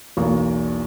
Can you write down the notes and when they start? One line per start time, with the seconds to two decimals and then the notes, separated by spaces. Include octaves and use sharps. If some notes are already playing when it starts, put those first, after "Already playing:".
0.17 B1 E2 A#3 C#6